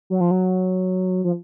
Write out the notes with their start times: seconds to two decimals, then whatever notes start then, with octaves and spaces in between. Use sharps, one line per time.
0.10 F#3
0.20 F3
0.31 F#3
1.24 F3